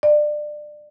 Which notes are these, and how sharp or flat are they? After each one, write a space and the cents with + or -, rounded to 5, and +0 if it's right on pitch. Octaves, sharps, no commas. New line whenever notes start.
D5 +25